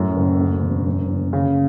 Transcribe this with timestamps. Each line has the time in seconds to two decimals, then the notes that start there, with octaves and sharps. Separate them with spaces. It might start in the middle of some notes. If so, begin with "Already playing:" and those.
Already playing: F#2 A2
0.17 F#1
0.40 D2
0.63 E1
0.86 F#2
1.09 F#1
1.33 C#3